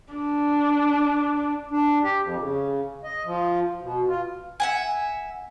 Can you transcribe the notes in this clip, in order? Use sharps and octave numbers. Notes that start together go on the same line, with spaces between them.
D4
D4
G4
F2
C#3
D#5
F3
B2
F4
E5 F#5 G#5